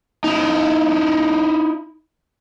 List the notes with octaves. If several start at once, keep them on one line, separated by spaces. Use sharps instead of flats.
D#4 E4